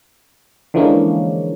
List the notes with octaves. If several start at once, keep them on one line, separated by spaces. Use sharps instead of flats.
D3 E3 F3 G#3 A#3 C#4